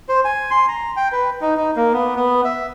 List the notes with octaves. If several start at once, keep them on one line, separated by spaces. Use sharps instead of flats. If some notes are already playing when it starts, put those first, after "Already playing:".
C5
G#5
C6
A#5
G5
B4
D#4
D#4
A#3
B3
B3
E5